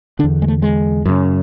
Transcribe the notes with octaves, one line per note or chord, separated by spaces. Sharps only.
E2 D3 D4
G#3
A3
G#3
F#2 C#3